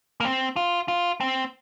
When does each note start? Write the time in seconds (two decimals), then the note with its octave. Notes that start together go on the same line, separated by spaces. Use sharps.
0.20 A#3
0.25 C4
0.56 F4
0.88 F4
1.20 C4